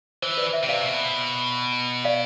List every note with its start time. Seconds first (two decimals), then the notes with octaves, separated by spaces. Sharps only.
0.22 E3 C5
0.38 B4 D5
0.53 C5 E5
0.63 C3
0.68 D5 F5
0.84 B2
2.05 D5 F5